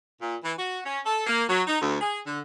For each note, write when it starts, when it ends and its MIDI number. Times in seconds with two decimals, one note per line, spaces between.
0.22 0.36 46
0.44 0.53 52
0.59 0.80 66
0.86 1.01 61
1.06 1.26 69
1.27 1.44 58
1.49 1.62 54
1.67 1.78 63
1.82 1.96 38
2.01 2.19 68
2.27 2.39 50